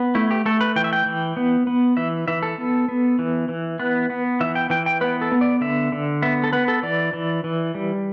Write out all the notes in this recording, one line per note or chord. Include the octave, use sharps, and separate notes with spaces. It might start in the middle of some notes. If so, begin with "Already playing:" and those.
Already playing: B3
A3 E4
G4
A3 A4
B4
E3 G5
E5
G5
E3
B3
B3
E3 E5
E3 E5
A4
B3
B3
E3
E3
B3 B4
B3
E3 E5
G5
E3 G5
G5
B3 B4
A4
B3
D5
D3 E5
D3
B3 E5
A4
B3 B4
A4
E3 D5
E3
E3
G3